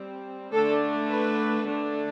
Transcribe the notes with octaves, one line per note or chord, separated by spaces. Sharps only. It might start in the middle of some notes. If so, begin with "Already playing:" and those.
Already playing: G3 C4
D3 A3 D4 A4
B4
D3 A3 D4